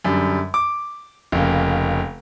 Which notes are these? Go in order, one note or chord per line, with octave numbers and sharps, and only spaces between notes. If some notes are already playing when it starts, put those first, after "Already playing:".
F#2 D3 G3
D6
F1 C#3 A#3